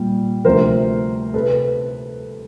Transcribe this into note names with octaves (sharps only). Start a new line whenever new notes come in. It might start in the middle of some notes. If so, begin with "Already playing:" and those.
Already playing: A#2 G3
D2 C3 F3 A#4 C5
C3 A4 B4